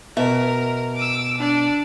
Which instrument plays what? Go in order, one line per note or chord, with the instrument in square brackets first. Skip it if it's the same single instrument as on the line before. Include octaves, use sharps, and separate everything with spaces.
[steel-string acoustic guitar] B2 E5 [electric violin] A#4
[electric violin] D6 E6
D4 D5